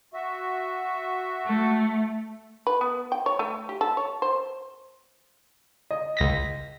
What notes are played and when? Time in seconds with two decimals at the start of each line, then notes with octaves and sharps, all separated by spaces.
0.13 F#4 E5
1.45 A3
2.67 B4
2.81 B3
3.12 G5
3.26 C#5
3.39 A3
3.69 G4
3.81 A4
3.97 C#5
4.22 C5
5.91 D#5
6.17 C#2 A#6 B6